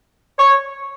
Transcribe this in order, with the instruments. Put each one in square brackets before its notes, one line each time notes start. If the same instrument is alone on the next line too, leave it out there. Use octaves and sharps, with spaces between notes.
[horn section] C#5